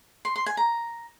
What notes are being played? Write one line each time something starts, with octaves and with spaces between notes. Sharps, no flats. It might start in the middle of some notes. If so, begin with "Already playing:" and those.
C6
C6
G#5
A#5